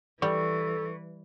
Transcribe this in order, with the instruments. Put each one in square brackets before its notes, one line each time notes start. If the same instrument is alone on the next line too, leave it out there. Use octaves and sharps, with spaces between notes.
[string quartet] E3 [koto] G3 [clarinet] A4 [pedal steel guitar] C#6